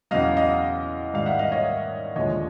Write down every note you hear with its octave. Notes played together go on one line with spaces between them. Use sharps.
E2 C#3 F#3 D#5 F5
D#5 F5
G#2 D#3 G3 F5
E5 F#5
D#5 F5
C#5 D#5
D#2 D3 F3 G#3 C#5 D#5